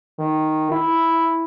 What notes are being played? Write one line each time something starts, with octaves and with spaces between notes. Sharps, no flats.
D#3
E4